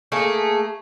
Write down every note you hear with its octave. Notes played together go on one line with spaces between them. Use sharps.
A3 A#3 G#4